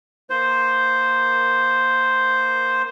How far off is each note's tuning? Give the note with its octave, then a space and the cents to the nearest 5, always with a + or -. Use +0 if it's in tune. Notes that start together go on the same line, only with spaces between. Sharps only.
A#3 +0 C5 +0